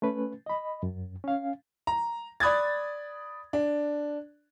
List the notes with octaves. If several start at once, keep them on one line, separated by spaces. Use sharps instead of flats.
A3 C#4 B4
D#5 B5
F#2
C#4 F5
A#5
D5 B5 D#6 F#6 G#6 A6
D4